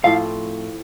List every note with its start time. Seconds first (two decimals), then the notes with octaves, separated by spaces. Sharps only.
0.03 A2 F3 C4 F5